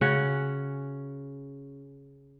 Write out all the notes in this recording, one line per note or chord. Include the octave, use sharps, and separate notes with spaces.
C#3 C#4 F#4 F#5